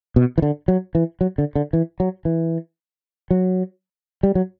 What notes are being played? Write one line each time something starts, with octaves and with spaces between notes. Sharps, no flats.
B2
E3
D3
F#3
E3
F#3
D3
D3
E3
F#3
E3
F#3
G3
F#3